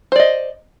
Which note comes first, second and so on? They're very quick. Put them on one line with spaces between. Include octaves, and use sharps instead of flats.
C5 D5 D#5